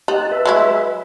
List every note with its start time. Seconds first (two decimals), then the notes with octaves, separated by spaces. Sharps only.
0.08 D#4 G4 A5 F#6
0.31 B4 E5
0.46 F#3 G#3 E4